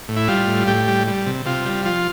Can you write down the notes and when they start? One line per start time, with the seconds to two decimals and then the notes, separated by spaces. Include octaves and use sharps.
0.08 A2
0.16 E4
0.28 G3 F4
0.47 A2
0.67 A2 G4
0.88 G3
1.07 G3
1.26 C3
1.46 C3 F4
1.65 G3
1.85 F3 F4